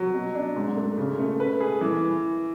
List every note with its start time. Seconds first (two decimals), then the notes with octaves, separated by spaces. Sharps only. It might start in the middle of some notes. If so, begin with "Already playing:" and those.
Already playing: F#3
0.14 B2
0.35 D4
0.56 G#2
0.76 A3
0.98 C#3
1.19 A3
1.40 B4
1.60 G#4
1.81 E3